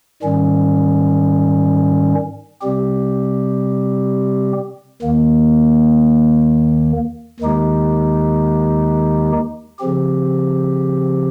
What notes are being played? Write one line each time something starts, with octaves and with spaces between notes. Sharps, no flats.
G#2 D#3 G3 C#4
C3 G3 C4 G4
D#2 D#3 A#3
D#2 D#3 G#3 D#4 G4
C#3 F3 C4 G4